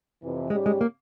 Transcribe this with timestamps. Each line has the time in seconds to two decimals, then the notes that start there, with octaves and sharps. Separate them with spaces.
0.21 F2 C3 E3
0.50 G#2 G3 G#3 C#4 G4
0.66 G#3
0.81 A#3